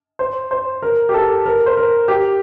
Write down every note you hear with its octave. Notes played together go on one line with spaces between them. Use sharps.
C5
C5
A#4
G4
A4
A#4
C5
A#4
G4